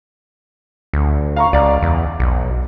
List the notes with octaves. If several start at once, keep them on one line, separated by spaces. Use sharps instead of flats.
D2
F5 A#5 C#6
C#2 D5 F5 A#5
E2
B1